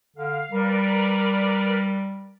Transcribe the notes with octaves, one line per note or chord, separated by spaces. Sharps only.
D3 F5
G3 A#4 B4 D5